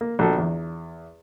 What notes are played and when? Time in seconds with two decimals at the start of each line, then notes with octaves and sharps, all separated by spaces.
0.01 A#3
0.19 A#1 B2 A4
0.38 E2